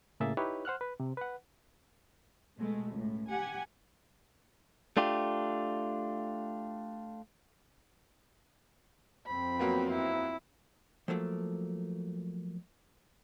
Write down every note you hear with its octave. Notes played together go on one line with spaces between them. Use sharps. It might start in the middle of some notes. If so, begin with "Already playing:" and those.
A2 C#3 A#3 G#4 E5 A6
D#4 E4 G4 B4 C#5
C5 F#5 F6 F#6
B4
C3
B4 F#5
B2 G#3 A3
C#2 A2
G4 F#5 G#5
A3 D4 F4 G4
F2 C4 B5
F#3 A#3 B3
E4
F3 F#3 A3 A#3